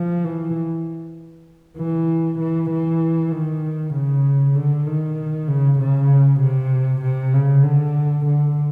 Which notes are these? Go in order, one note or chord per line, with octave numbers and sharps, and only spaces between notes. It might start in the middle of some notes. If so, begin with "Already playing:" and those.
Already playing: F3
E3
E3
E3
E3
D#3
C#3
D3
D#3
C#3
C#3
C3
C3
C#3
D3
D3